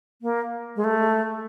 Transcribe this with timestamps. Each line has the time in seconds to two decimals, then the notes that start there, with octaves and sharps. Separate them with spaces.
0.22 A#3
0.76 G#3
0.84 A3